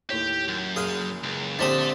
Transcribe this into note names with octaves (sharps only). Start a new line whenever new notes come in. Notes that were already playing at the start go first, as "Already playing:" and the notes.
D#2 A2 G4 C#5
F#2
F#1 G#4 F5 G#5
C#2
A#1 D3 C4 G4 A4 E5 A5 D#6